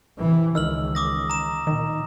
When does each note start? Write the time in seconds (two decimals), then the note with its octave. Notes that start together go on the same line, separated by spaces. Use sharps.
0.18 C3 E3
0.55 C#2 D#3 E6 F6 F#7
0.95 D6 D#6 A#6
1.30 A#5 E7
1.67 A#2 D#3